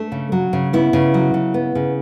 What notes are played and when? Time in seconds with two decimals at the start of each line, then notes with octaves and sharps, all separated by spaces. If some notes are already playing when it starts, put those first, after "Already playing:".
Already playing: A3 D4
0.12 C#3
0.32 F#3
0.53 C#3
0.73 B3 E4
0.93 C#3
1.14 F#3
1.34 C#3
1.54 B3
1.75 C#3